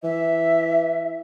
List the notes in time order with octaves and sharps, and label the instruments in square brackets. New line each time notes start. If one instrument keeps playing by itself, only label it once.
[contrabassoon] E3 [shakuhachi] E5